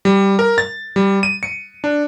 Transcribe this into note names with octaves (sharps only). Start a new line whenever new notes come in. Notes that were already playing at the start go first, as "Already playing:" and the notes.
G3
A#4
A6
G3
D#7
C#7
D4